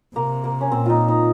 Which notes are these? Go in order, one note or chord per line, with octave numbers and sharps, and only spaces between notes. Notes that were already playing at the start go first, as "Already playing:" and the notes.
C3 A#3
A#3
C#4
A#2 C4
D#4 F4
D#4